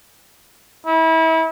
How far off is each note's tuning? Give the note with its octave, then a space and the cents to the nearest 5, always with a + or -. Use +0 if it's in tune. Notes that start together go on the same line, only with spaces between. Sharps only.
E4 -30